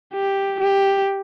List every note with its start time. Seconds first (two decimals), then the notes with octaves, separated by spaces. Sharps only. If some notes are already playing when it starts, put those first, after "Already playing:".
0.13 G4
0.60 G4